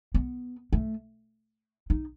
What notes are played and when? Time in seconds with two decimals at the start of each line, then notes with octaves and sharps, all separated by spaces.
0.14 B3
0.73 A3
1.90 D#4